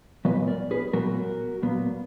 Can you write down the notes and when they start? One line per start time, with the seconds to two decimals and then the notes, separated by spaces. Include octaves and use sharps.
0.25 A#2 F#3 B3 B4 D#5
0.48 A#4 D5
0.71 G#4 B4
0.93 A#2 F#3 B3 F#4 A#4
1.62 A#2 F#3 B3